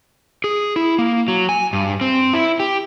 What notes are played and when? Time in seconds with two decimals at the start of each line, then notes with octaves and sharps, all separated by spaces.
0.44 G#4
0.76 E4
0.99 A#3
1.28 F#3
1.49 G#5
1.73 G2
2.01 C4
2.34 E4
2.60 G4